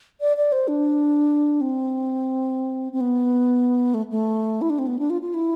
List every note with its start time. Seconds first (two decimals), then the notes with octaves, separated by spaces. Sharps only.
0.21 D5
0.37 D5
0.52 C5
0.68 D4
1.61 C4
2.92 C4
3.01 B3
3.94 A3
4.11 A3
4.62 E4
4.70 D4
4.79 C4
4.87 B3
4.99 D4
5.10 F4
5.22 F4
5.34 E4